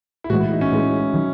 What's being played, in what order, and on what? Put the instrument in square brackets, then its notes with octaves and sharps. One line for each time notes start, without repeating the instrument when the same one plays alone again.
[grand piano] E4
[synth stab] A2 E3 G#3 [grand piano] F#4
[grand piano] E4
D#4
C#4
[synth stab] A2 E3 G#3
D#3 F#3